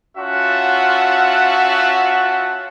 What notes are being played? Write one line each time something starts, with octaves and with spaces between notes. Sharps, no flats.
C#4 F4 F#4 E5 F#5 A5